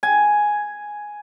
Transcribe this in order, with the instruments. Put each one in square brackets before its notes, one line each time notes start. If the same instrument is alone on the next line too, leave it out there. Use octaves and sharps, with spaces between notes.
[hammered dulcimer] G#5